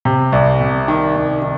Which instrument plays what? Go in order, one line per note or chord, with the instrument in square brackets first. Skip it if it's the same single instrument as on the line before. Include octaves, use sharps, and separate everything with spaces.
[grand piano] C3
C2
C3
D#3
C2
D#3